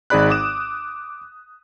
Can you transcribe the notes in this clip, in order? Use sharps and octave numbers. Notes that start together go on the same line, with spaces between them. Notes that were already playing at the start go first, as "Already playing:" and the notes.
G#1 D#4 G#4 D5 B5 F#6
D6 D#6 E7